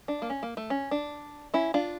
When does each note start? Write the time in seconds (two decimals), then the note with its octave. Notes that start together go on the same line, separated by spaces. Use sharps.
0.08 D4
0.22 A#3
0.30 C#4
0.43 A#3
0.57 A3
0.70 C#4
0.91 D4
1.54 C#4 E4
1.74 D4 F4